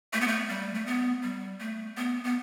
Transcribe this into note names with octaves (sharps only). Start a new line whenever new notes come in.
A3
B3
A3
G3
A3
B3
G3
A3
B3
B3